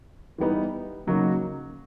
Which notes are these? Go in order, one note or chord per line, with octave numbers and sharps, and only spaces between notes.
E3 G3 B3 D#4
C#3 F#3 A#3 D#4 F#4